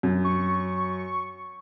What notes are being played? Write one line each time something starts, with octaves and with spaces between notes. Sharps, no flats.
F#2
C#6